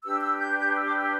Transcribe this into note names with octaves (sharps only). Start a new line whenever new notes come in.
D4 G4 B4 E6
E6
G6
G6
E6
D6
E6